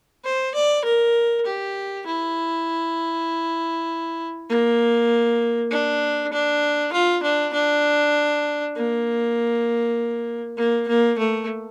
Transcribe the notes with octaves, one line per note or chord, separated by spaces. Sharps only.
C5
D5
A#4
G4
E4
A#3
D4
D4
F4
D4
D4
A#3
A#3
A#3
A3